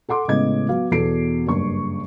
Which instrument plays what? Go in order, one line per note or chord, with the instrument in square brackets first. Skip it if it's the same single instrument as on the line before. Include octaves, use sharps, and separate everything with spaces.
[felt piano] A4 F#5 C6 D6
A2 C#3 G#3 B3 D#5 G#6
F#3 B3 F5
E2 B2 A4 C7 D7
F#1 G2 C#6